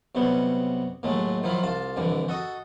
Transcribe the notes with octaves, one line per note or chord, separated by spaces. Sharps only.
B1 C3 G3 B3 C#5
D#2 A2 F#3 G#3 A3
D#3 F3 F#3 E4 F4
C2 F4 A5
C2 F2 D3 E3
F#4 A4 D#5